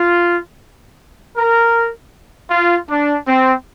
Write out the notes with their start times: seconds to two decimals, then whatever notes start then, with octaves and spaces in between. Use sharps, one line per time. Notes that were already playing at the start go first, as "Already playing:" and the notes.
Already playing: F4
1.37 A#4
2.50 F4
2.89 D4
3.27 C4